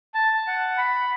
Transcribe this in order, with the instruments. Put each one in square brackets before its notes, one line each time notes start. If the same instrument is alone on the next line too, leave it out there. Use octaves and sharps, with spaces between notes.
[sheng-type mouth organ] A5
F#5
B5